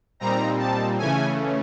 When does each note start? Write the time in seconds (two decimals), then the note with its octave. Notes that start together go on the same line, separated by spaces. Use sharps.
0.20 A#2 G3 C4 D#4 A#5
0.59 A5
0.98 C#3 E3 A3 C#4 G#5